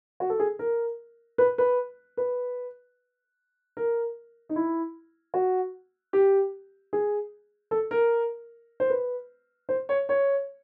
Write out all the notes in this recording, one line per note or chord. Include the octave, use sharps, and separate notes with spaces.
F#4
A4
G#4
A#4
B4
B4
B4
A#4
D#4
E4
F#4
G4
G#4
A4
A#4
C5
B4
C5
C#5
C#5